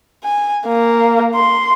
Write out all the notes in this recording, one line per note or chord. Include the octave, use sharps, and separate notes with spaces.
G#5
A#3
C6